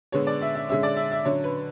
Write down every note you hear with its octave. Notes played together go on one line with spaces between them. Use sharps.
D3 G#3 B3 C#5
D5
E5
E5
D3 G#3 C#4 E5
D5
E5
E5
D3 F#3 C#4 C#5
B4